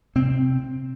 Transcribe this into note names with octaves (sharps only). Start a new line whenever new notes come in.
C3 C4